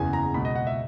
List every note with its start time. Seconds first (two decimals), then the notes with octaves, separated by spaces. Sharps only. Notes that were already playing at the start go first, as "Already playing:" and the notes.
Already playing: F#1 E2 C#3 E3 G#5
0.13 A#5
0.34 B2 B5
0.37 C#2
0.45 D#5
0.56 F#5
0.67 E5